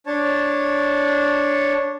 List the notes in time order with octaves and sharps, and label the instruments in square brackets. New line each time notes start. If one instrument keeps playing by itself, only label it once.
[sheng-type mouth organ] D4 C#5 A5